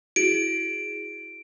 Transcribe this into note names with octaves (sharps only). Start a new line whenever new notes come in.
E4 F#4 G#4 D7